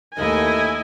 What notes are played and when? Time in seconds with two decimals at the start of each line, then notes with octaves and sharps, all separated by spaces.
0.17 D#2 A3 E4 D#5 G#5